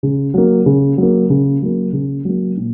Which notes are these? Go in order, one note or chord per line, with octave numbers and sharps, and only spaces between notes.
C#3
F#3 A#3
C#3
F#3 A#3
C#3
F#3 A#3
C#3
F#3 A#3
A#2